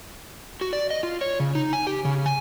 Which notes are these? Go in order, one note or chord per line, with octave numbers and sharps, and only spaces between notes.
F#4
D5
D#5
F4
C#5
C#3
D#4
G#5
G4
C#3
G#5